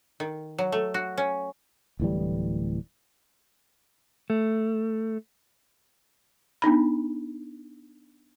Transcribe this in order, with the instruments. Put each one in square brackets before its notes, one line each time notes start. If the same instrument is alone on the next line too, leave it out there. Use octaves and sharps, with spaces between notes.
[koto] D#3
F#3
A3
F#4
C#4
[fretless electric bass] D1 A2 E3 G3
[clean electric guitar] A3
[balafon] B3 D4 D#4 B5